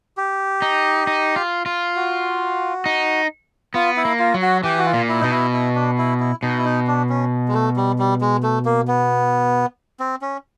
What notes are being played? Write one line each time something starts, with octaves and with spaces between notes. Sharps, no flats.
G4
D#4
D#4
F4
F4
F#4
D#4
B3 F4
E4
A#3
F4
F#3
F#4
E3 G4
F#4
F4
A#2
E4
B2 D#4
E4
E4
D4
E4
E4
B2 D#4
E4
D#4
D4
C#4
G#3
A3
G3
G3
G#3
A3
A#3
B3
C4
C#4